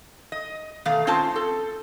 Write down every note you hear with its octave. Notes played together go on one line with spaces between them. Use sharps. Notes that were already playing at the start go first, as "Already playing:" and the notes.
D#5
B2 D#3 A3 F5
C4 C#4 F4 C5 A5
A4